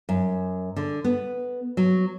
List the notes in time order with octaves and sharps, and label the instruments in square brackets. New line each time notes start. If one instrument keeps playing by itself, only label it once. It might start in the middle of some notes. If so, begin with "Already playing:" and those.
[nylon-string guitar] F#2
D3
B3
F#3